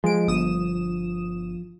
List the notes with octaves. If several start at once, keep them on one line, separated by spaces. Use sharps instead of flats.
F3 G#3 D7
G1 D#6 E7